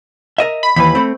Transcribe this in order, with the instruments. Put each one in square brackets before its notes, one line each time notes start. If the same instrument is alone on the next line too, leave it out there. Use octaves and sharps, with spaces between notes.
[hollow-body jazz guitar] A#4 D#5 E5
[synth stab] B5
[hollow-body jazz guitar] D#2 E3 B4 [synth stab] B5
[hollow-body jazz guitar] A3 C4